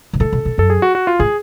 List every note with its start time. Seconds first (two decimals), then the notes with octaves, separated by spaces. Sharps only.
0.13 B2
0.20 A2 A4
0.32 B2
0.45 B2
0.58 F#2 A4
0.70 G#4
0.82 F#4
0.95 F#4
1.07 F4
1.19 A2 G#4